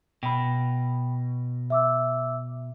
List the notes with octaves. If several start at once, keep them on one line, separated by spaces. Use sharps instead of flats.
B2 G5 B5
E5 D6 E6